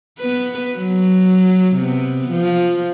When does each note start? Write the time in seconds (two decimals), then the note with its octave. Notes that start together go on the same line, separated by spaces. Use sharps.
0.19 B3 B4
0.78 F#3
1.76 C3 B3
2.31 F3